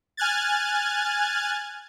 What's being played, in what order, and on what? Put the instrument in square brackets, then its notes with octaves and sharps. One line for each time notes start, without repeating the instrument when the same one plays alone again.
[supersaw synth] G#5 F6 F#6 G#6 A6